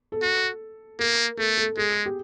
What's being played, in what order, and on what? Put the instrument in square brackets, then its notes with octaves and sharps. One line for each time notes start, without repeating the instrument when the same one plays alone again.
[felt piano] A4
[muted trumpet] F#4
[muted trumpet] A#3 [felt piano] A#4
[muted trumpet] A3 [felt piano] A4
[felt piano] A4
[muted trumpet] G#3 [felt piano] G#4
[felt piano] G4